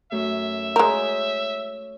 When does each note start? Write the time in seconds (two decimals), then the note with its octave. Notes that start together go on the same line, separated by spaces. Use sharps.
0.12 F#2 A3 E5
0.76 G#3 A#4 C#5 D#6 G6